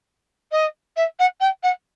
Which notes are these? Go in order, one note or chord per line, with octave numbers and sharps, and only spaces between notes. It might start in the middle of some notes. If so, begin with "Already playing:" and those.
D#5
E5
F#5
G5
F#5